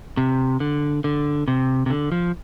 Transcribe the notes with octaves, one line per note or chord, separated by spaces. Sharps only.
C3
D3
D3
C3
C3
D3
F3